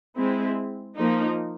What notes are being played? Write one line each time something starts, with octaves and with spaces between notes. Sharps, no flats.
G#3 C4 E4
F3 A#3 D#4